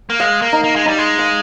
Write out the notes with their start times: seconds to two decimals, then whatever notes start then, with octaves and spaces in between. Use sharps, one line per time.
0.10 A#3
0.20 G#3 F5
0.42 A#3
0.53 D#4
0.64 A#3
0.76 G#3
0.85 G3 D#4
0.98 G#3
1.18 F5